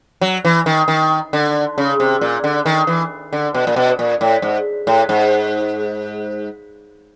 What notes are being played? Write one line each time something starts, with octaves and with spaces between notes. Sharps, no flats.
F#3
E3
D#3
D#3
D3
C#3
C3
A#2
D3
D#3
E3
D3
B2
A#2
B2
A#2
A2
G#2
A2
G#2